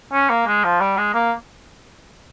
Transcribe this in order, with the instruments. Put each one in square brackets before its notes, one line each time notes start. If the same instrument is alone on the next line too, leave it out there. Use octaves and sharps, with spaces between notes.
[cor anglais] C#4
A#3
G#3
F3
G3
G#3
A#3